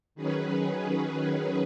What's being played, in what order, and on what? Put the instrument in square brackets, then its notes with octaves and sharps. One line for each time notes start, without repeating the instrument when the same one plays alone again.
[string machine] D#3 F#3 C#4 G#4 B4